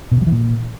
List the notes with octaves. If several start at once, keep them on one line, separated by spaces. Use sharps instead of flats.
B2
C#3
F#3
E3
A#2